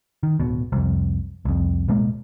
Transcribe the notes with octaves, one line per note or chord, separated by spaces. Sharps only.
D#3
D1 B2
C2 F2
C2 F2
D1 B2 G#3 A#3